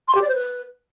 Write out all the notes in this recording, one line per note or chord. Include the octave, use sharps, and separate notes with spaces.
C6
G4
D5
C5
B4